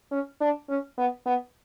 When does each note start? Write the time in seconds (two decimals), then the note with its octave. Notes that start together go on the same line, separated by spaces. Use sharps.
0.12 C#4
0.41 D4
0.69 C#4
0.98 B3
1.26 B3